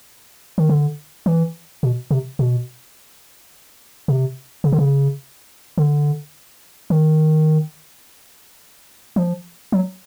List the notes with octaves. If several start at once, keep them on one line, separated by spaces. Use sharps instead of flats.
D#3
D3
E3
B2
C3
B2
C3
C#3
D3
C#3
D3
D#3
F3
F#3